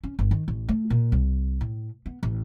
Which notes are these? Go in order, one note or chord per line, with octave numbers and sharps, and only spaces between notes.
C#4
G1
D#3
A1
A3
A#2
C2
A2
B3
A1